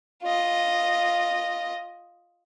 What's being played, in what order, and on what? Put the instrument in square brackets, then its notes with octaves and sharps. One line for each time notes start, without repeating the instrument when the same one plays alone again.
[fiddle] F4 D#5